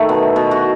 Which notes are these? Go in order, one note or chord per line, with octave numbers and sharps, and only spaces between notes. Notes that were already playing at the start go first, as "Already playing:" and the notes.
Already playing: D#3 A3 E4
B2
B2
F#4